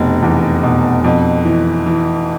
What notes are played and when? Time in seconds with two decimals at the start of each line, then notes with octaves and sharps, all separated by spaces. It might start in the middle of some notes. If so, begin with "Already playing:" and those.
Already playing: F1 B2
0.23 E2
0.63 B2
1.04 F2
1.45 E3
1.86 E3